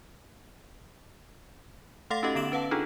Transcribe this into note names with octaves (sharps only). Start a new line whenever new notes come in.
A3 A4 F5 F#5 C6 A6
C#4 D#4 F#4 G4 A4 D#5
D3 B3 D7 E7 F#7
C#4 B4 F5 F#5 A5
D4 D#4 F4 G#4 A4